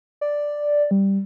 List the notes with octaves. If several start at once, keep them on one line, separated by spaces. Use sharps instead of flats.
D5
G3